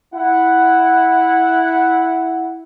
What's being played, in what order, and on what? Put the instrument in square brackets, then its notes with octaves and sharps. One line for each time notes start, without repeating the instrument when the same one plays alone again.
[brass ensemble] E4 F#5